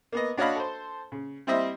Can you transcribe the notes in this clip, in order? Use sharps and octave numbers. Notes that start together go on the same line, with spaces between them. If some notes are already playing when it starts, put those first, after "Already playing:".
A#3 B3 D#5
D4 F#4 C#5 D#5 F5 B5
A4 C5
C#3
G3 C4 E4 C5 D#5 E5